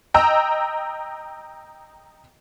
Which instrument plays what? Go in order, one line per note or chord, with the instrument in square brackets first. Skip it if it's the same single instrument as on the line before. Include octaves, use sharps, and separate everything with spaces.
[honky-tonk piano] D#5 G5 A#5 E6